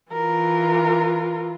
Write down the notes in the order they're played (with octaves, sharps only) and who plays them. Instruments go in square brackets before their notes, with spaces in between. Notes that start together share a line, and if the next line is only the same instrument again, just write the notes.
[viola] E3 F4 [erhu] A#4